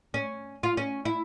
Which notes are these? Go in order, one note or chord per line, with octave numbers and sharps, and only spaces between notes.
C#4
F4
C#4
E4